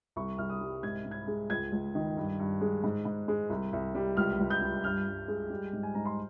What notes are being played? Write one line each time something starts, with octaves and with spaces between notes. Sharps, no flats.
C2 C#6
C2 F6
D#6
G3
G#2 G#6
G#2
G#6
G#3
C#2 G#6
C#2
D#3
G2
G2
G#3
G#2
G#2
G#3
C2
C2
G3
C#2 F6
C#2
G6
G3
G2 F6
G2
G#3
G3
G#2
G#5
G#2 A#5
C6